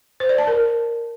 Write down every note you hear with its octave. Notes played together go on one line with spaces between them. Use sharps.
C5
D5
A5
A#4